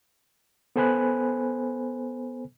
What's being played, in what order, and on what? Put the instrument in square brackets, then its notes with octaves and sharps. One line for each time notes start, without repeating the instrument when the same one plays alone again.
[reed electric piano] B3 A4 C5 G#5 B5 F#6